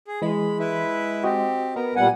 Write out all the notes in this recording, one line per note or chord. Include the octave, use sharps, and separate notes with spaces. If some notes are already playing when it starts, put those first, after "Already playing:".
G#4
E3 G#3 B5
E4 B4 E5
C4 F#4 G4 D#5
B3 A#4
A#2 G3 F#5 G#5